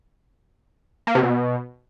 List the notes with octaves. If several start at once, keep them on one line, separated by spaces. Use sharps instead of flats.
A#3
C3
B2